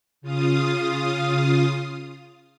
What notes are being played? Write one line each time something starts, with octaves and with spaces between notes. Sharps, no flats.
C#3 F4 F5 D#6